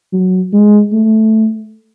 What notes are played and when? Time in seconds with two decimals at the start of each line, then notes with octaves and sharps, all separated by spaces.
0.13 F#3
0.53 G#3
0.93 A3